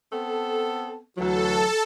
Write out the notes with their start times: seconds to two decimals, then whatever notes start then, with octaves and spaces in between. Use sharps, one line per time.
0.13 B3 C4 A4
1.18 D2 E3 F#3 A4